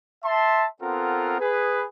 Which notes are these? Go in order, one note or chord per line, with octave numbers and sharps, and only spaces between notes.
E5 A5 C6
B3 C4 F4 A4 A#4 F#5
G#4 B4